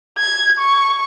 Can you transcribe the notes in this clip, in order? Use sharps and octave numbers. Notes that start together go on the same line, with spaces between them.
G#6
C#6